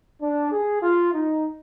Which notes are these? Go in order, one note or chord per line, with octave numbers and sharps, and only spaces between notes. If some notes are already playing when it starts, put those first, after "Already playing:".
D4
G#4
F4
D#4